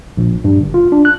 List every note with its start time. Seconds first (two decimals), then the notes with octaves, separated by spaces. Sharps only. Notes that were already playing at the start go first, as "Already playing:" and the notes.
0.17 A#1
0.44 G2
0.60 G1
0.74 F4
0.92 D4
1.05 F#6